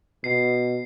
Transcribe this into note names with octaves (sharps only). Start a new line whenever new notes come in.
B2 C7